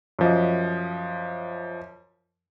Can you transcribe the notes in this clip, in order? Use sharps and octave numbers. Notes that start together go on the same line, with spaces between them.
F#2 F3 D#5